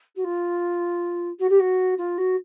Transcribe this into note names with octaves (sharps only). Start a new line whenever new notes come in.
F#4
F4
F#4
G4
F#4
F4
F#4